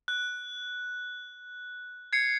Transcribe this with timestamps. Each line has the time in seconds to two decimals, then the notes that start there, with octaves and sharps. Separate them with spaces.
0.08 F#6
2.13 G#6 C7 C#7